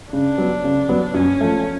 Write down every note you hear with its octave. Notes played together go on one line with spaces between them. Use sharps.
C#3 D4
F#3 B3
C#3
F#3 B3
F#2 C#4
F3 A3